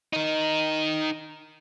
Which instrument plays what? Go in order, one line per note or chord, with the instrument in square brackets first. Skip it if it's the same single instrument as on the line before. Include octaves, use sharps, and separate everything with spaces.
[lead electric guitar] D#4 A#4